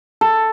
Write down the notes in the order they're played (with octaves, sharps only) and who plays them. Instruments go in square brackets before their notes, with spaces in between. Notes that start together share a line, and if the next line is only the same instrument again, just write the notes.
[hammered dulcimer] A4